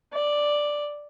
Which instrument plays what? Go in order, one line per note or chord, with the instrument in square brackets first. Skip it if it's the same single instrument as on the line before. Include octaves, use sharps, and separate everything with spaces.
[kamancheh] D5